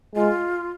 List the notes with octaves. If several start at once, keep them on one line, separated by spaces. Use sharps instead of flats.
G#3 F4